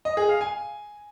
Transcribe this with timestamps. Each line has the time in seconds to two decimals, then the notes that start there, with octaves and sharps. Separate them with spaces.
0.05 D#5
0.17 G#4
0.29 F5
0.41 G#5